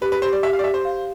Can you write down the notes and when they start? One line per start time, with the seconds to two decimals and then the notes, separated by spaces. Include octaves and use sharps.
0.01 G4 B4
0.12 B4
0.22 G4 C5
0.32 D5
0.43 G4 E5
0.53 F5
0.59 D5
0.64 G4 E5
0.74 C5
0.85 F5